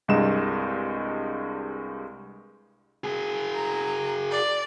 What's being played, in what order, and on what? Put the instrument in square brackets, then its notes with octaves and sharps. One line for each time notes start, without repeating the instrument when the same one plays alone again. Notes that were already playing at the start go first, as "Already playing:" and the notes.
[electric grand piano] C2 G2 G#3 D#5 E7
[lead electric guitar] F#4 G#4
[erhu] A#5
D5